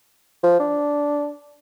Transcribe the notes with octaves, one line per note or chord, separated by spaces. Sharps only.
F3
D4